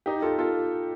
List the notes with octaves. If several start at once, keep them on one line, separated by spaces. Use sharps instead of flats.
D#4 G4
F4 A4
F4 A4